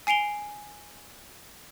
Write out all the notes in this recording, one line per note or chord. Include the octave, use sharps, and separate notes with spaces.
G#5 C7 D7 F7 G7